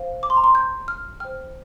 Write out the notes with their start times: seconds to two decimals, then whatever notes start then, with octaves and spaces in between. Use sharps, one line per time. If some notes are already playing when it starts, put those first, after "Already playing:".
Already playing: C5 F5
0.23 D6
0.30 C6
0.37 A#5
0.44 C6
0.55 G6
0.88 F6
1.20 C5 G5 F6